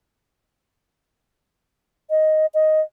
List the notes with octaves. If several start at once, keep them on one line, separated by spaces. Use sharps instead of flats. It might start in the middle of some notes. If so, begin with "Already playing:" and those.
D#5
D#5